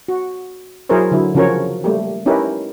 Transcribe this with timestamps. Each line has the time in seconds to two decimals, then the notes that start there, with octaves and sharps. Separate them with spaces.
0.08 F#4
0.89 F#3 E4 G#4 A#4 C5 C#5
1.11 D3 F#3 E4
1.35 C#3 F3 C#4 F#4 A#4 C#5
1.84 G3 A3 A#3 G4
2.26 C#4 D#4 E4 G4 A#4 B4